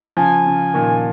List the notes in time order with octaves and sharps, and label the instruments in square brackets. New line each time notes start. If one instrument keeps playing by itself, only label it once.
[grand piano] C#3 F3 [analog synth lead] G#5
[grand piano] C#3
A#2 D#3